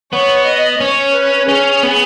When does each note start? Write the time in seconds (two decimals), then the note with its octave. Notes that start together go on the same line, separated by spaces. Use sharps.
0.12 B3 C#5
0.46 D#5
0.80 C#4 C#5
1.14 B4
1.49 C#4 G#4
1.83 B3